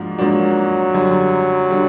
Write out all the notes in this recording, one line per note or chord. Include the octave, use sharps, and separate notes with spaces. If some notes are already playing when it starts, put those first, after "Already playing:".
Already playing: G#2 F3 A#3 D4 F#4
G#2 F3 F#3 A#3 D4 F#4
F#2 D3 G3
D3 G3